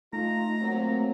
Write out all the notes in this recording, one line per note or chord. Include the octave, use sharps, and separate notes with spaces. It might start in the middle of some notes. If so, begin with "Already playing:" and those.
A3 D#4 F4 A#5
F#3 A#3 C4